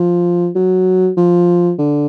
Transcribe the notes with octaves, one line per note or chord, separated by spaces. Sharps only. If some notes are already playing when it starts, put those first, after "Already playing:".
Already playing: F3
F#3
F3
D3